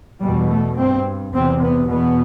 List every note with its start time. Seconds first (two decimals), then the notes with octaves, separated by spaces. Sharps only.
0.21 E2 B2 G3
0.48 A3
0.77 G2 C4
1.32 E2 C3 C4
1.61 B3
1.88 E2 B2 B3